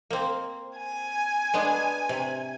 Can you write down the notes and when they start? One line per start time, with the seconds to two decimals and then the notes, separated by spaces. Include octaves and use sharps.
0.10 A#3 C4
0.78 G#5
1.54 G#3 B3 D4
2.09 C3